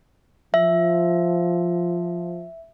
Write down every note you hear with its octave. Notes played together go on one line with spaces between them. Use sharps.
F3 E5